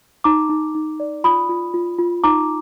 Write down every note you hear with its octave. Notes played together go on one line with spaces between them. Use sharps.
D#4 A#5 D6
D#4
D#4
D5
F4 B5 D#6
F4
F4
F4
D#4 A#5 D6